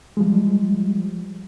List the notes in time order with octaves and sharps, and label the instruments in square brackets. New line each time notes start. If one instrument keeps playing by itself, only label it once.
[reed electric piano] F3 G3 G#3